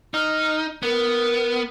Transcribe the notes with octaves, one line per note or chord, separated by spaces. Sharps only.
D#4 F6
B3 A#4